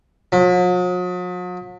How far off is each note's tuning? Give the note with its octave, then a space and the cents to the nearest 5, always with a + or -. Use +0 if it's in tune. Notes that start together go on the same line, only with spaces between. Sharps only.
F#3 -45